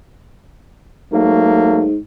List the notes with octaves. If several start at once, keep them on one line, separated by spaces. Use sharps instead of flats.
G#2 F#3 A3 A#3